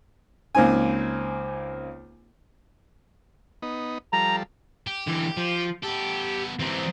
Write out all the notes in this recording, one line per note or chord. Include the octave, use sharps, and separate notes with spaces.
C#2 A#3 C4 D#4 G#5
B3 D#4
F3 G3 A4 A#5
G4
D3 E3
F3
B3 G4 A4
E3 C4 G4 A#4